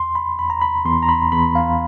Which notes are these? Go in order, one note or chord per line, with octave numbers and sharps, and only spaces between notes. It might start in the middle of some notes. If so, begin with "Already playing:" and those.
Already playing: E2 C6
B5
E2 B5
A#5
B5
E2 C6
A#5
B5
E2 B5
F5